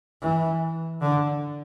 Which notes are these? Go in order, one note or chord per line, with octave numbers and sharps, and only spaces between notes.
E3
D3